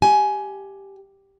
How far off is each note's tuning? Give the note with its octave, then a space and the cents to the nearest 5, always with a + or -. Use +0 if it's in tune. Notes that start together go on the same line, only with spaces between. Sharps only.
G4 +0 G#5 +15